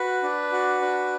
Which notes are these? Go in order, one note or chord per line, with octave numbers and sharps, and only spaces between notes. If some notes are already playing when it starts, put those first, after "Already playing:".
Already playing: F#4 B4
D4
F#4
D4